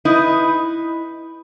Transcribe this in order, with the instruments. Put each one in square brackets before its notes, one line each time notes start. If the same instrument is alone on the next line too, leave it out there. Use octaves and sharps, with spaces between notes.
[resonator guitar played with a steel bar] D#4 E4 B4 D#5